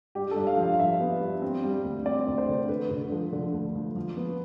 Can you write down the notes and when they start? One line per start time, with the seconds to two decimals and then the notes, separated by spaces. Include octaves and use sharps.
0.15 G2 G4
0.31 A4
0.36 G2
0.47 F5
0.57 F3
0.63 F5
0.74 F5
0.79 G2 E5
1.01 B3
1.21 G2
1.42 C4
1.64 G3
1.84 D2
2.06 C4 D5
2.28 D2
2.38 C5
2.49 D3
2.69 D3 B4
2.91 D3
3.12 F3
3.33 D3
3.54 D2
3.75 F3
3.96 F3
4.17 B3